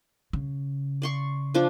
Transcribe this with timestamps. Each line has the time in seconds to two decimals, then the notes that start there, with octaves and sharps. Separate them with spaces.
0.33 C#3
1.02 D5 C6 C#6
1.54 F3 D4 F4